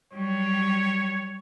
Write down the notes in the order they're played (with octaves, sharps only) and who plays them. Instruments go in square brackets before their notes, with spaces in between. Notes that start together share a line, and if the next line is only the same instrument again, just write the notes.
[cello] F#3 G3 [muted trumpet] C#5